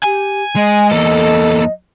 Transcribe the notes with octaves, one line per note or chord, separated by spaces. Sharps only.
G4 G#5
G#3 D#5
E2 A#3 A4